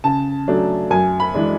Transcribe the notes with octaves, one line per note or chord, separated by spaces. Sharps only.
C#3 A5
F#3 A3 D4
F#2 G#5
B5
E3 G#3 D4